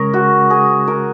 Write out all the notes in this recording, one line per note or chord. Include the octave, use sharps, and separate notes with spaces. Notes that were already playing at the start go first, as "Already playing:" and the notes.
Already playing: C#3 G#3 C#4 G#4 A#4 C#5
F#4
G#4
A#4